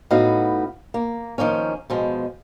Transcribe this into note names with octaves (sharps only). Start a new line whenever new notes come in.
A2 B3 D#4 F#4 F5
A#3
D#3 F3 A#3 C#4
B2 F3 G#3